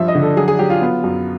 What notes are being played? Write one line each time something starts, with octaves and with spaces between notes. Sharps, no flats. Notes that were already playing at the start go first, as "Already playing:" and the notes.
Already playing: G2 F3 E5
D#5
D3
A4
F#3 G#4
G#4
F#3 G4
F4
B3
F#2